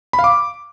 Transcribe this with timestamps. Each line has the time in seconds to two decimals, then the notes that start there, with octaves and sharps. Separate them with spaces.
0.13 B5
0.19 F5
0.24 D6